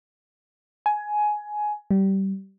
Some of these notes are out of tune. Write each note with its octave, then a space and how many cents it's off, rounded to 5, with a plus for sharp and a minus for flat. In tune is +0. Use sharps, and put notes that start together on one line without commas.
G#5 +15
G3 -20